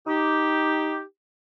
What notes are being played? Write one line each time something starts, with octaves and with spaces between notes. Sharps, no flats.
D#4 G4